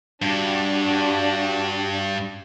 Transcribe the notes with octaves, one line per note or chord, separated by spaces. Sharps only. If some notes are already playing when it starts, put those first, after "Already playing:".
G2 D4 F#4 G4